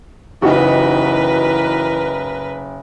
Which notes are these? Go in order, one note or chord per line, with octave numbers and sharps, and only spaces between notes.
F#1 E3 D#4 F#4 G4 A#4 B4 C#6